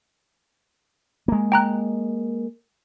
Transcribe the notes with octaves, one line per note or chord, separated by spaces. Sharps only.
G#3 A#3
G5 A#5 F#6